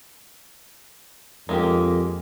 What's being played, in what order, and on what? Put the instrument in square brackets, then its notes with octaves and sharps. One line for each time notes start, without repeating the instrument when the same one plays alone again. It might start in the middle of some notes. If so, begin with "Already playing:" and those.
[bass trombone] F2 [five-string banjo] G#3 A#3 G4